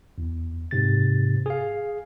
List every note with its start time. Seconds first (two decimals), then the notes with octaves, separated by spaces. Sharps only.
0.18 E2
0.71 G#2 C3 A6
1.46 G#4 F5